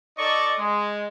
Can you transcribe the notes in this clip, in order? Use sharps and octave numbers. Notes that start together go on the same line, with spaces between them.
D#4 A4 D5 D#5 C#6
G#3